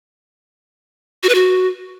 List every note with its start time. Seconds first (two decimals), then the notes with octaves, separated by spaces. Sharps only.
1.23 F#4
1.29 B4
1.35 F#4